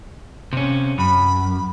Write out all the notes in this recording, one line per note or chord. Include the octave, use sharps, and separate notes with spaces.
C3 C#4
F#2 B5